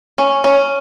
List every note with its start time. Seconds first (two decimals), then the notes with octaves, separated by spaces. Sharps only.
0.18 C#4
0.44 C#4